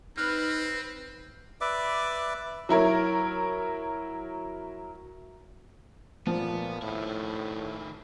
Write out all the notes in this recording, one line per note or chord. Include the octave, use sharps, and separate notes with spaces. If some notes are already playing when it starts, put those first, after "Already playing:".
C4 D#4 B4 F6 F#6
B4 D5 E5 D6
F#3 E4 A#4 C#5
A#2 F3 A3 B3
A2 D#3 E4